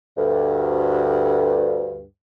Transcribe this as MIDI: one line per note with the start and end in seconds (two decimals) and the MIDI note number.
0.17 2.04 38
0.17 2.04 43